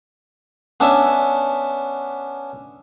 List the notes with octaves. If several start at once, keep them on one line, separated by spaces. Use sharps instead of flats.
B3 C#4 D4 C#5 E5